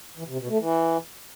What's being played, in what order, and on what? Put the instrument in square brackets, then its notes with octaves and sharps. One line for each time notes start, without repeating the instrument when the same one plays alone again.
[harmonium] E3
C3
B2
A3
E3